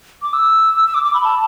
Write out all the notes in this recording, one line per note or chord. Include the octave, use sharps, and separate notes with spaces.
D6
E6
E6
D6
D6
B5
A5